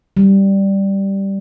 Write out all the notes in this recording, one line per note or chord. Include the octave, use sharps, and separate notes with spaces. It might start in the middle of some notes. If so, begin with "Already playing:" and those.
G3